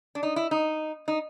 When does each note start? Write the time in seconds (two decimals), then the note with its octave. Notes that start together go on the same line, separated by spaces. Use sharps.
0.15 D4
0.23 D#4
0.36 E4
0.51 D#4
1.08 D#4